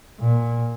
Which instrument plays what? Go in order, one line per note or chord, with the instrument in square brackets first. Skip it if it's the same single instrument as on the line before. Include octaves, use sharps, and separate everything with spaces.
[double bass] A#2